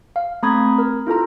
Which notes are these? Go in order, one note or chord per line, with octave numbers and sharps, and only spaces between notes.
F5
A3 C4 A#5 B5 D#6 G#6
A#4
E4 F4 A4 A#5